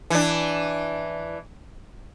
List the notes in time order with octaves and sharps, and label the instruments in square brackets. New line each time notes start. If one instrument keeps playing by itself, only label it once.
[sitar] E3 D4